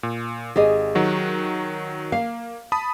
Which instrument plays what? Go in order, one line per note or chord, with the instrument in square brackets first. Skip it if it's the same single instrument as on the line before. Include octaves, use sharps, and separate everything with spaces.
[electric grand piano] A#2
[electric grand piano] G#1 [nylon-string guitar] G4 G#4 D#5
[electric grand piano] D#3 F#3 F#4
[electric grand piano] A#3 [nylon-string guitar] F5
[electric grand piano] A5 B5 D#6